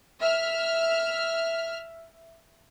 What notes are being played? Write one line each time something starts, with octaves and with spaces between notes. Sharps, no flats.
E5 F6